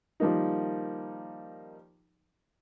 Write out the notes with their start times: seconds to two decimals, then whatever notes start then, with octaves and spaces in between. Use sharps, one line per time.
0.20 D#3 F3 G3 A#3 D#4